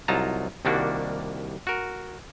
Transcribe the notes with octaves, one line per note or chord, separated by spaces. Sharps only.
C2 F#3 D#4 F4 A5 A#5
C2 D#3 G3 A#3 D4 F#4
F#4 A#4